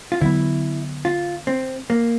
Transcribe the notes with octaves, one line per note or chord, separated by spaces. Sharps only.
F4
D3 F#3 B3 E4
F4
C4
A#3